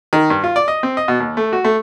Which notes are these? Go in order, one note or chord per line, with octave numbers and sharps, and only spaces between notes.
D#3
G2
F4
D5
D#5
C4
D#5
B2
D#2
A3
F#4
A3